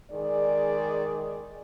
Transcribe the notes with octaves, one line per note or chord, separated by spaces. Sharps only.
D#3 G#3 G#4 D5